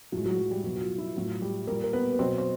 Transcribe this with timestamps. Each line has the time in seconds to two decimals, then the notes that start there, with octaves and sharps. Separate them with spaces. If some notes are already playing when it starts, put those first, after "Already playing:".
0.12 A2 F3 F#3 G#3 F#4
0.26 F#3 F#4
0.38 F#3 F#4
0.51 G3 G4
0.64 B2 F#3 F#4
0.76 F#4
0.81 F4
0.98 E4
1.16 A2 F#3 F4
1.41 G3 G4
1.67 A#2 G3 A#3 A#4
1.84 A#4
1.93 B3 B4
2.13 B4
2.19 B2 F#3 C4 C5
2.38 C5